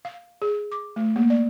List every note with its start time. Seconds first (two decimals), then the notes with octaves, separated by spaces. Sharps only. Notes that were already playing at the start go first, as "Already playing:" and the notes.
0.05 F5
0.42 G#4
0.72 D6
0.96 A3
1.16 A#3
1.30 D5